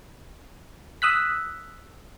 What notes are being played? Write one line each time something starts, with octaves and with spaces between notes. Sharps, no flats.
D#6 E6 F#6 B6